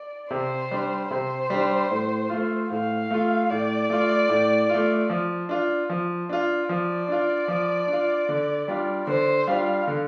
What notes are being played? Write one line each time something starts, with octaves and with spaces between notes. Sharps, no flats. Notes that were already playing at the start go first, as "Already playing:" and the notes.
Already playing: D5
C3 C5
G3 D4
C3 C5
G3 D4
A2
A3 F4
A2 F5
A3 F4
A2 D5
A3 F4
A2
A3 F4
F3
D4 F4
F3
D4 F4
F3 D5
D4 F4
F3
D4 F4
D3
G3 D4 F4
D3 C5
G3 D4 F4 F5
D3